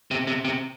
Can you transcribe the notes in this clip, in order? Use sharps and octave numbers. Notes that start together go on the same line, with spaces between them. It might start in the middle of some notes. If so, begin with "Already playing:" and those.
C3
C3
C3